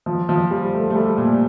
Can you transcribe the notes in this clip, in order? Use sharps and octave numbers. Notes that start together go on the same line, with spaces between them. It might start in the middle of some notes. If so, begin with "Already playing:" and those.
F3
F3
G3
A3
A3
G3
A#2